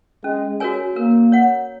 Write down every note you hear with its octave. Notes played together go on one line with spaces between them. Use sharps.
G#3 C#4
F#4 A#4 C#5 G#5
A#3 A#4
C#5 F#5